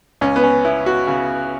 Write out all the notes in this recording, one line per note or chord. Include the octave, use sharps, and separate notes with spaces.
C#2 C#4
B3
C#4
B3 E4
F#4
C#3